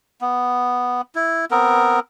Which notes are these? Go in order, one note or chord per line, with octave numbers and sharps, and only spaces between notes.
B3
E4
B3 C4 A#4